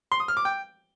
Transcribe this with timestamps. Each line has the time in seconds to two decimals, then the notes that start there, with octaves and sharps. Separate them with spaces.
0.12 C6
0.20 D#6
0.28 F6
0.37 D6
0.45 G5